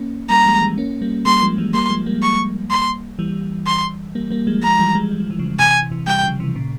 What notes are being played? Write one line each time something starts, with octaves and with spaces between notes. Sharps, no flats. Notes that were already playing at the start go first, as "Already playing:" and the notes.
Already playing: A#3 C#4
G3 A#3 A#5
F3 G#3
E3 G3
A#3 C#4
G3 A#3
G3 A#3 C6
F3 G#3
E3 G3
G3 A#3 C6
F3 G#3
G3 A#3
C#6
C6
E3 G3
C6
G3 A#3
G3 A#3
F3 G#3
F3 G#3 A#5
E3 G3
F3 G#3
G3
F3
E3
C#3 F3
C3 E3 G#5
C3 E3
E3 G3 G5
C#3 F3
C3 E3
A#2 C#3